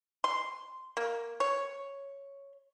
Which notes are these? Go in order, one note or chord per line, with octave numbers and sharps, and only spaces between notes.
C6
A#3
C#5